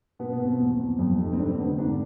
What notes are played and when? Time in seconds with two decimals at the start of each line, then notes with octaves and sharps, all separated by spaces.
0.19 B2 B3
0.32 B3
0.39 B2
0.46 C4
0.60 E2
0.79 E2
0.99 F2
1.19 F1
1.33 C4
1.38 F1 D4
1.48 C4
1.59 D3 B3
1.69 C4
1.78 G#2 D4